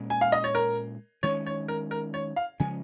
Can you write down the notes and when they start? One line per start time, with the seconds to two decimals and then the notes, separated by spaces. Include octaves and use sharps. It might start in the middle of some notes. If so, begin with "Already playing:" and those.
Already playing: A#2 G#3 C#4
0.10 G#5
0.21 F5
0.32 D#5
0.44 C#5
0.55 A#4
1.23 D#3 G#3 C#4 C#5
1.46 C#5
1.68 A#4
1.91 A#4
2.14 C#5
2.36 F5
2.60 C#3 F3 G#3 C#4 G#5